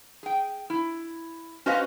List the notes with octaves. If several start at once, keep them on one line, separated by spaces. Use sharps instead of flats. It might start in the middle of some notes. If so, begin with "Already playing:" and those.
G#4 G5
E4
C#4 F#4 B4 C5 D#5 F5